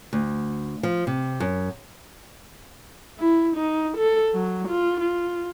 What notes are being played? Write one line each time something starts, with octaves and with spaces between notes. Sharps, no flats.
D2
F3
C3
F#2
E4
D#4
A4
F#3
F4
F4